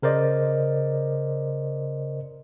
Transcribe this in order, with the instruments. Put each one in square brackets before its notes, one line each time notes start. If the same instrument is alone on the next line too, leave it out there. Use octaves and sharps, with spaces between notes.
[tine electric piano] C#3 A#4 C5 D5 D#5